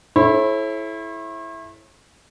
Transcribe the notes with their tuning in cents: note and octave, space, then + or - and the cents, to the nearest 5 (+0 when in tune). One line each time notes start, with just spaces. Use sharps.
E4 +0 A4 -30 C#5 -45